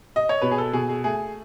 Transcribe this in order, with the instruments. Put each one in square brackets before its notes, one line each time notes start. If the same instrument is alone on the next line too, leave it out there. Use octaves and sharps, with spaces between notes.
[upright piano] D#5
C#5
B2 B4
G#4
A4
B2 G#4
G#4
A3 G#4